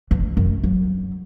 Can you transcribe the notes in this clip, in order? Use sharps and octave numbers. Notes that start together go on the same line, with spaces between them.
E3
F#2
F#3